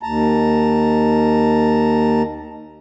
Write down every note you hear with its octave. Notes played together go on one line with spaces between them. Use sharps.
D#2 A5 A#5